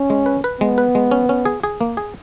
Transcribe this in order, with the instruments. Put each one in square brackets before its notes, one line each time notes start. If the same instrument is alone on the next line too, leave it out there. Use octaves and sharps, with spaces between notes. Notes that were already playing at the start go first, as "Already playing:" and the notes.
Already playing: [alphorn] C#4
[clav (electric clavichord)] G#3
B4
B4
[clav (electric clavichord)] G#3 [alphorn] B3
[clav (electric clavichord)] B4
G#3
C#4
C#4
G#4
G#4
A#3
G#4